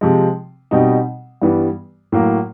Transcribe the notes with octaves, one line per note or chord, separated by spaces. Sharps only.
C3 F3 G#3
B2 G3 C4 D#4
G2 E3 G3 B3
A2 F#3 A#3